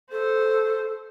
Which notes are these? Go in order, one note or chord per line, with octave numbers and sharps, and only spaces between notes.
A4 C5